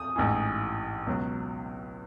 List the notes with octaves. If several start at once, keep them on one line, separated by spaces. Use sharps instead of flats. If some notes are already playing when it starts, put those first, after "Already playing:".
Already playing: D#6
A1 G#2 E3
C#2 B2 F#3